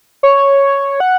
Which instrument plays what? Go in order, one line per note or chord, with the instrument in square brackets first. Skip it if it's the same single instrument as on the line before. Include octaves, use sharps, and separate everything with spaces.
[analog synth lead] C#5
F#5